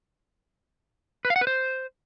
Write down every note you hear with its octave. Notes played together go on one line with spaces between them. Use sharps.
B4
F5
F#5
B4
C5